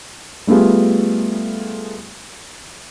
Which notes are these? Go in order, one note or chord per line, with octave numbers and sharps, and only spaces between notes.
G3 A3 B3 F4 G#4